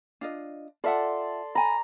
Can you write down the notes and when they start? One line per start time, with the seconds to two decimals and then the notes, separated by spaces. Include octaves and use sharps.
0.21 D4 F4 D#5
0.84 F4 A4 D5 E5 F#5 C6
1.55 G#5 A#5 B5